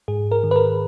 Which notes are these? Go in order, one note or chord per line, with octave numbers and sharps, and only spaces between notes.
G#2 G#4
A#4
D#3
B4
A#4